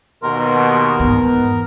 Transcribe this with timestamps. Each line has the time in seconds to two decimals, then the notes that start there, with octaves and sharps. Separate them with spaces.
0.23 D#2 B2 A#4 C6
1.00 E2 G#2 B3